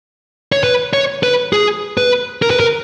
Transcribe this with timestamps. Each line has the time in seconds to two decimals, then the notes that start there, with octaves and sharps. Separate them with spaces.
0.52 C#5
0.64 B4
0.93 C#5
1.23 B4
1.53 G#4
1.97 B4
2.42 A#4
2.51 B4
2.60 A#4